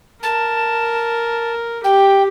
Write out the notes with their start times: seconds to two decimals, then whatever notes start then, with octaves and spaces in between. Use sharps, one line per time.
0.22 A#4 A5
1.84 G4 G5